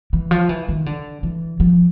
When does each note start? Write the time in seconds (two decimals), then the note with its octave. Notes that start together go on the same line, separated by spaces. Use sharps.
0.13 E3
0.31 F3
0.49 E3
0.69 D#3
0.86 D3
1.23 E3
1.60 F3